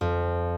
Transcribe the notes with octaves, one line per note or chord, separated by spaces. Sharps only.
F2